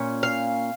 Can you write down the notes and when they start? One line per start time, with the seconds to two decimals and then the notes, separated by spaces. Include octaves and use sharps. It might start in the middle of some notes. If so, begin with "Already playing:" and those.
Already playing: A#2 C#4
0.23 F5